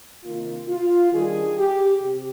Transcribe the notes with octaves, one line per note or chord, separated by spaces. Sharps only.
C3 D#3 A#3 D#4 F4
F4
D#3 G3 D4 G#4
G4
C3